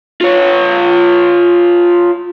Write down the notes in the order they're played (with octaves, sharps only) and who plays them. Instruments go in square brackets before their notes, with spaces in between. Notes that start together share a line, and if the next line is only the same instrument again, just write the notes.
[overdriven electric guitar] F4 C#5